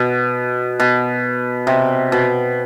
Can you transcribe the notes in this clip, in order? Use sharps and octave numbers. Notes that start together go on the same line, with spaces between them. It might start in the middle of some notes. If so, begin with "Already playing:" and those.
Already playing: B2
B2
C3
B2